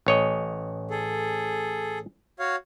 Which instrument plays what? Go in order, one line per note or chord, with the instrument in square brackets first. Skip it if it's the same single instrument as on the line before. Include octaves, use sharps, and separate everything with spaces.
[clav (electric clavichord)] A1 C#5 D#5
[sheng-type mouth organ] G#4 A4
F#4 C#5 F5